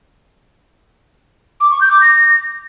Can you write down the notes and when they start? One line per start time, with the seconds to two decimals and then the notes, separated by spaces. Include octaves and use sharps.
1.60 D6
1.70 C#6
1.81 G6
1.91 D6
2.01 A#6